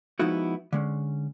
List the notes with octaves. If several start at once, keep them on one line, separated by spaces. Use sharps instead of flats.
F3 G#3 B3 D#4 E4 F#4
D3 G#3 C#4